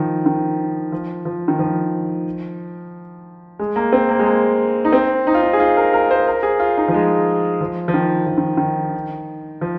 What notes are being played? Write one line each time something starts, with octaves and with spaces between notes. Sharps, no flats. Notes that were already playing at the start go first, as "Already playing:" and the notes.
Already playing: D#3 F3
D#3
F3
F3
D#3
F3
G#3
A#3
C4
A#3
G#3
A#3
D#4
C4
D#4
F4
D#4
G#4
F4
A#4
A#4
C5
A#4
G#4
F4
D#4
F3
G#3
F3
F3
D#3
F3
D#3
D#3
F3